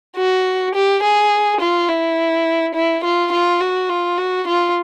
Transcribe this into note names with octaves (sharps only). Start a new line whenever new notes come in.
F#4
G4
G#4
F4
E4
E4
F4
F4
F#4
F4
F#4
F4